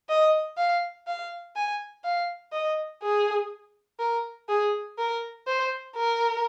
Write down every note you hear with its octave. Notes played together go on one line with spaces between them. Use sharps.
D#5
F5
F5
G#5
F5
D#5
G#4
A#4
G#4
A#4
C5
A#4